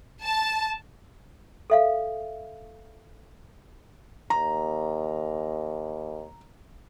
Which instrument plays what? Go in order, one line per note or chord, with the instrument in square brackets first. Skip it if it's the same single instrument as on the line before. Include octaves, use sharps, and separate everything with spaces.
[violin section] A5
[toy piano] A4 E5 F5
[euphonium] D#2 [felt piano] A#5